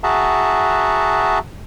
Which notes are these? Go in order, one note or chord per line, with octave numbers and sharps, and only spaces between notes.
F#4 G#4 E5 F#5 A5 A#5